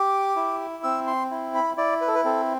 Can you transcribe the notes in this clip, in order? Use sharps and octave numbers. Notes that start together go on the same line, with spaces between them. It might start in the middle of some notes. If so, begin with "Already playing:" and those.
Already playing: G4 D6
E4
C4 E6
C6
E4
B5
E4 D5
B4
A4
B4
C4 A4